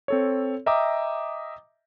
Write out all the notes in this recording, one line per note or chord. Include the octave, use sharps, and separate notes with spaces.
C4 A4 C#5
D#5 E5 G5 A#5 D6 D#6